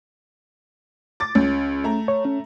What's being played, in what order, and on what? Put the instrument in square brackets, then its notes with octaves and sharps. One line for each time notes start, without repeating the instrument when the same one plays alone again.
[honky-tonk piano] D6 A6
[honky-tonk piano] C#2 [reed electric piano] C#4
[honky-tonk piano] A3 A#5
[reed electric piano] C#5
C#4